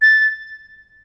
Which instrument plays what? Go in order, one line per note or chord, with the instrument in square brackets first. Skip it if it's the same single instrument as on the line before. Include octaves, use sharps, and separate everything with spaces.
[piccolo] A6